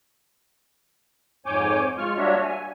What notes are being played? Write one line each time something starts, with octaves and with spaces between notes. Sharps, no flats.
F2 G#2 C#5 G#5 D6 G6
G#3 F4 C#6 F6
G3 A#3 D4 F#4 C#5 E5
G#5